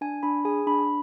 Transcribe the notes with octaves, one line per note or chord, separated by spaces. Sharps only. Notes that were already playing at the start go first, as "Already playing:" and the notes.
D4 G#5
D4 B5
G#4 G#5
D4 B5